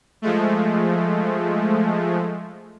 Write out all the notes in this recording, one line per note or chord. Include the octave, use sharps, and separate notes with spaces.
F3 G#3 A3